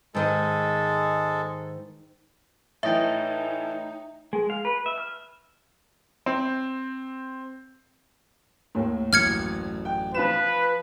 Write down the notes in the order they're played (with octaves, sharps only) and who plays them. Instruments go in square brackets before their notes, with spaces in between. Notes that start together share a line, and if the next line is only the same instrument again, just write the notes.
[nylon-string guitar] G#2 D#3 D#5 [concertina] G#3 A4
[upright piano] A2 E3 [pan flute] D#4 [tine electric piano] C#5 D#5 G5 [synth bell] E5
[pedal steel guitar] G#3
F5
B4
E5
F6
[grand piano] C4
[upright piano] D#2 A2
[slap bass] A1 F#2 [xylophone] F6 G#6 C#7
[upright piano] G5
[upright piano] F3 F4 E7 [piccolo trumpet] B4